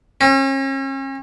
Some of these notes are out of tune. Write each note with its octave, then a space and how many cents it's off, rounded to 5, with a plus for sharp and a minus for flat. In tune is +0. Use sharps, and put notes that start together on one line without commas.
C#4 -40